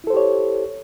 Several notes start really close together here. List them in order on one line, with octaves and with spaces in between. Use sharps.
E4 A4 C5 G4 C#5